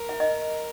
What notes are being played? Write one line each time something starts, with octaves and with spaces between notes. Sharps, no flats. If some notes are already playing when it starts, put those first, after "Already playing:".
Already playing: A#4
E5
D#5